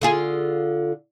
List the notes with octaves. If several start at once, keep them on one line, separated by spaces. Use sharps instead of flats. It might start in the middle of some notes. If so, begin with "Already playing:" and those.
D3 F4 G#4